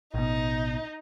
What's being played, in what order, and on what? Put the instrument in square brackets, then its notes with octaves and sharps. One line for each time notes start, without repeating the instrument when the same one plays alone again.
[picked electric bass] A1 B2 [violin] D#4